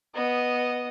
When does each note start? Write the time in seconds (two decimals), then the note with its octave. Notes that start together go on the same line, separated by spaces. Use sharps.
0.15 B3 D#5